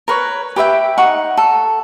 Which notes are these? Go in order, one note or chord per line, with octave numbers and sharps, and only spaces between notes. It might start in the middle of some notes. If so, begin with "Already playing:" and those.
A#4 B4 C#5
G4 B4 E5 G5
D#4 F#5 C#6
A4